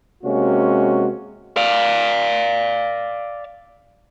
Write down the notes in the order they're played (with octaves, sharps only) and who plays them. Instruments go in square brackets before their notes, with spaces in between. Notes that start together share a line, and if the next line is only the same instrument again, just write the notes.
[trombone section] C3 G#3 A#3 C#4 F#4
[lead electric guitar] D5 F5